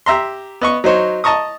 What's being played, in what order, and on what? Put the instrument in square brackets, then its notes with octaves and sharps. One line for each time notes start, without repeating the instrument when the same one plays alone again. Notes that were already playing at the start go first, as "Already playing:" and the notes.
[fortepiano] G4 E5 A#5 C6
B3 D#5 C#6
F#3 D#4 C5 C#5
D#5 A5 A#5 C#6 D#6